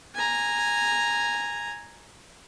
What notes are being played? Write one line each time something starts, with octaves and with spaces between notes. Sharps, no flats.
G#5 A#5